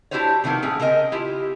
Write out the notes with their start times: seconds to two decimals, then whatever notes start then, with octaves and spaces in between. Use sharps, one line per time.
0.11 D4 E4 F#4 G4 C5 C#5
0.44 C3 D#3 F3 A#3 B3
0.62 A2 C#4 G#4 G5
0.80 C#3 C4 A#4 D#5 G#5
1.12 E4 F4 G4